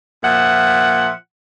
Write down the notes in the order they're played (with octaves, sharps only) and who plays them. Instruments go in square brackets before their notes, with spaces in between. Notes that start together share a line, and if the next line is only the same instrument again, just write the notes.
[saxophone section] A#2 F3 E5 F#5